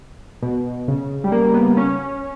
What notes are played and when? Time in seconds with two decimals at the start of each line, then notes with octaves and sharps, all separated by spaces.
0.42 B2
0.88 C#3
1.24 G3
1.32 A#3
1.54 B3
1.77 C#4